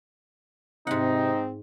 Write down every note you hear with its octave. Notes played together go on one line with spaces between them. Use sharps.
G#2 C3 G#3 C4 D#4 F#5